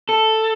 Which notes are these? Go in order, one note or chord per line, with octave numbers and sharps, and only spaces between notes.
A4